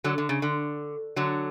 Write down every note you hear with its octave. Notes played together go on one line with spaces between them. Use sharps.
D3 F#3
D3
C#3
D3
D3 F#3